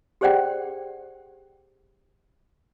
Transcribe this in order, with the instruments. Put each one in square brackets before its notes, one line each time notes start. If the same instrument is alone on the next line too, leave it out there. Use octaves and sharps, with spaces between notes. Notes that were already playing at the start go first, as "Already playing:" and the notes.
[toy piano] G4 G#4 C5 D5 F#5 G5